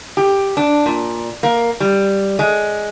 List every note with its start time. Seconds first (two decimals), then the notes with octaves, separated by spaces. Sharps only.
0.17 G4
0.57 D4
0.86 A#2
1.43 A#3
1.80 G3
2.39 G#3